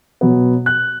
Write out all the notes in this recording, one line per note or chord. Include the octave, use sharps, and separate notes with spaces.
B2 F#3 B3
F#6